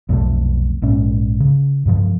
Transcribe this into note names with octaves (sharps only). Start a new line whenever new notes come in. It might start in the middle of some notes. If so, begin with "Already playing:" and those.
B1 F2 C3 A3
A#1 G#2 C#4
C#3
G2 C3 F3